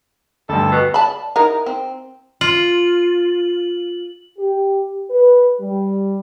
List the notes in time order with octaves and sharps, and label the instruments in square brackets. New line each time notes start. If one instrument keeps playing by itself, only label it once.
[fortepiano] D2 G2 [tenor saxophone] A4
[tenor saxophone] B2
[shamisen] D5 A5 B5
D#4 E4 A#4
C4
[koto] F4 [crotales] F#7
[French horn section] G4
B4
G3